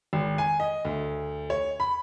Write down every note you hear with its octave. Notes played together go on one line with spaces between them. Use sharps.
G#1
G#5
D#5
D2
C#5
B5